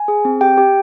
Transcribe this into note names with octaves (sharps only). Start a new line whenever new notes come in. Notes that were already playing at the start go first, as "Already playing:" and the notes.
Already playing: G#5
G#4
C4
G4 G5
G4